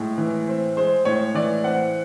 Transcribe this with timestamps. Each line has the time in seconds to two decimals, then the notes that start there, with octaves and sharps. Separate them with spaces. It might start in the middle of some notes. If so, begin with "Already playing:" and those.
Already playing: A2 G#3
0.18 E3
0.48 C4
0.77 G#3 C5
1.05 A2 C#5
1.35 E3 D5
1.64 C4 F#5